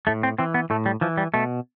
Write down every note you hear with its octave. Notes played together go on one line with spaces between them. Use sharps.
A2 A3
C4
E3 C4
B3
A2 A3
G3
E3 F3
G3
B2 A3